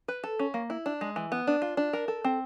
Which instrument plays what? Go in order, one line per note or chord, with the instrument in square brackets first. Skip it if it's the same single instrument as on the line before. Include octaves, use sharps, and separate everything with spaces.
[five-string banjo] B4
A4
C#4
A#3
E4
D4
G#3
E3
B3
D4
F4
D4
A#4
A4
C4